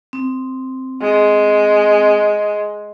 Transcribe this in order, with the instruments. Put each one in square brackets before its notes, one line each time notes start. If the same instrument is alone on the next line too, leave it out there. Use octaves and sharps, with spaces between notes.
[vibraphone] C4
[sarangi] G#3